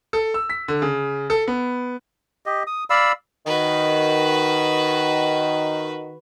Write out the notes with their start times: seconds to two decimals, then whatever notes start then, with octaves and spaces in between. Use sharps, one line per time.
0.13 A4
0.34 E6
0.50 B6
0.68 D3
0.82 C#3
1.30 A4
1.48 B3
2.46 G4 D#5
2.67 D#6
2.90 D5 F5 B5 E6
3.46 D#3 F#4 B4